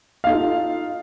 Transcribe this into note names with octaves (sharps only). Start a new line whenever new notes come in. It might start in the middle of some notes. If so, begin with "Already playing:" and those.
D#4 F4 A4 F5